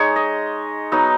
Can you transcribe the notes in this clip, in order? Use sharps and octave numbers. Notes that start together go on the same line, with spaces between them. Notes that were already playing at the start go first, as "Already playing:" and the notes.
Already playing: G#3 D#4 C#5
D#5
F#3 B3 D#4